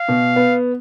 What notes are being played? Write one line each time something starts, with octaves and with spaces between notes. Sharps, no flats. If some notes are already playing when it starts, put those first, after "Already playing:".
Already playing: F5
B2
B3